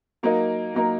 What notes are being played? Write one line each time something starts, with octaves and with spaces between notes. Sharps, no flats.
F#3 A#3 D#4 A#4
F#3 A#3 D#4 A#4